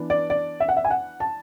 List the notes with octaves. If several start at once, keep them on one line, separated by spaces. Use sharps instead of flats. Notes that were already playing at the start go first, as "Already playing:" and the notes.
Already playing: E3 B3 D4
D5
D5
E5
F#5
E5
G#5
F#5
A5